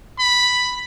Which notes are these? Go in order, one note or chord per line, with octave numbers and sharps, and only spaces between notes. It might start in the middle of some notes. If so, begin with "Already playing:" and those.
B5